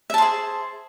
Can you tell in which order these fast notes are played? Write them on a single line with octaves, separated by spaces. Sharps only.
E5 A5 C5 G#4